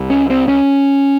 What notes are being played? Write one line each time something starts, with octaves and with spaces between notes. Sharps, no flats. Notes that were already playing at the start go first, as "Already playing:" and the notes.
Already playing: C2 C3
C#4
C4
C#4